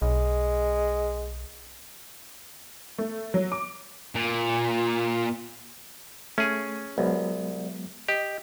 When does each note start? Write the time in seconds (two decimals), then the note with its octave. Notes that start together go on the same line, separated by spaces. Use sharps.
0.02 B1 G#3
2.98 A3
3.34 F#3
3.52 D6
4.15 A#2
6.38 A3 C#4 G#4
6.98 C2 F#3 G#3 B3
8.08 G4 D#5